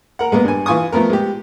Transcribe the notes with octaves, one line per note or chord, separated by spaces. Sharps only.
A#4 F#5
G#3 A#3 B3
G2 G#5
E3 F4 G#5 C#6 D#6
F3 A3 B3 A#4
G#3 G4